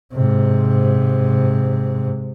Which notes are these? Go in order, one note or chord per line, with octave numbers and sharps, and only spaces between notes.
G#2 C3